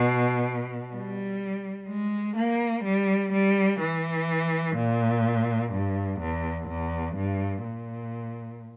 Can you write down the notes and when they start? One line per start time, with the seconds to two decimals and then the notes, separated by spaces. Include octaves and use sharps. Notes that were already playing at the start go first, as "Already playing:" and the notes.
Already playing: B2
0.93 G3
1.88 G#3
2.36 A#3
2.84 G3
3.33 G3
3.79 E3
4.76 A#2
5.72 G2
6.20 E2
6.68 E2
7.16 G2
7.64 A#2